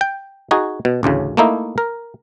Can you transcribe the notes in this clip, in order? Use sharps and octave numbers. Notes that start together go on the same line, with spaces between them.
G5
D#4 F#4 G#4
B2
A1 D2 A2 C#3
A3 A#3 D#4 E4
A#4